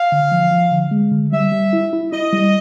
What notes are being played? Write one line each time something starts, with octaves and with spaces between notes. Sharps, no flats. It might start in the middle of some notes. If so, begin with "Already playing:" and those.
Already playing: F5
D3
F3
F3
D3
G#3
D3
G3 E5
G3
E4
E4
E4 D#5
G3